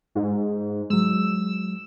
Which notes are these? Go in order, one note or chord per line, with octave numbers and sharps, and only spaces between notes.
G#2
F#3 G#3 E6